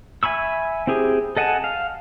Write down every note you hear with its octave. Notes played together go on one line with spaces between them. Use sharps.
E5 G#5 B5 C#6 E6
C4 E4 G4 G#4
A4 D#5 F#5 G#5 A5
F5